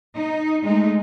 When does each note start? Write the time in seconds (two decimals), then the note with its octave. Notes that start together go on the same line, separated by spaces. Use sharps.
0.16 D#4
0.64 G#3 A3 D#4